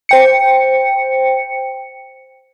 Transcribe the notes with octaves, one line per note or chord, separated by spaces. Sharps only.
C5 G5 C#7